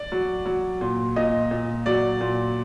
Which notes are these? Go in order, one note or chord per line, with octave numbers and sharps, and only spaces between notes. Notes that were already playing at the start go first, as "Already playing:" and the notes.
Already playing: D5
F#3
F#3
A#2
A#2 D#5
A#2
F#3 D5
A#2